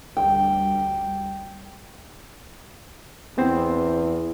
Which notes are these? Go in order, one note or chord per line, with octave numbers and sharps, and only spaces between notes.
D2 G3 G5
E2 B3 C4 C5